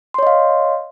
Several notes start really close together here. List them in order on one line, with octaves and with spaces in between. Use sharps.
C6 C#5 D#5 F5